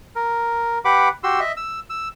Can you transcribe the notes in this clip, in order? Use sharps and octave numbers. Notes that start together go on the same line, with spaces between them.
A#4
G4 B4 F#5 B5 D6
F#4 G4 C6 E6
D#5 E5
E6
E6